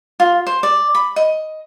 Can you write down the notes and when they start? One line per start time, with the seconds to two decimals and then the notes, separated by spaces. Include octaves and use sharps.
0.20 F4
0.47 C5
0.63 D5
0.95 B5
1.16 D#5